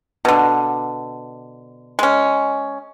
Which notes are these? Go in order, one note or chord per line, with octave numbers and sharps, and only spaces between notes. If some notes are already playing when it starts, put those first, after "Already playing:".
B2 D3
G#3 C#4